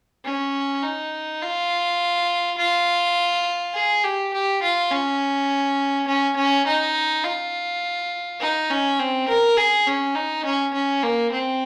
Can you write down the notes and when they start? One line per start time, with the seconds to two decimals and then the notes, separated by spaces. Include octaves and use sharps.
0.25 C#4
0.83 D#4
1.42 F4
2.58 F4
3.74 G#4
4.04 G4
4.34 G4
4.63 F4
4.91 C#4
6.07 C#4
6.36 C#4
6.66 D#4
7.24 F4
8.40 D#4
8.71 C#4
8.99 C4
9.28 A#4
9.57 G#4
9.87 C#4
10.15 D#4
10.45 C#4
10.74 C#4
11.03 A#3
11.32 C4